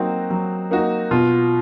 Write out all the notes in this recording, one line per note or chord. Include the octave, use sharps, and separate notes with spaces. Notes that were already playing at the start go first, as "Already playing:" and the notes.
Already playing: F#3 A#3 C4 D#4 F#4
F#3
A#3 D#4 F#4
B2 F4